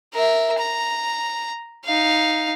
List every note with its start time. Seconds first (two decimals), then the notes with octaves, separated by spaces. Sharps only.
0.13 A#4 E5
0.59 A#5
1.85 D#4 F5